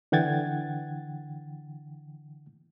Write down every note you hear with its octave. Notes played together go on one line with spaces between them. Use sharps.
D3 E3 F#5 G5 G#6 A6